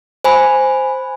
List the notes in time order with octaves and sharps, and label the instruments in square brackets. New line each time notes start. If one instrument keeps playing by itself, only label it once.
[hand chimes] C5 G#5 B5